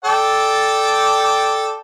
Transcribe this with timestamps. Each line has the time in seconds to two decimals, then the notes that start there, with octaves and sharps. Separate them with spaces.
0.05 A4 D5 G5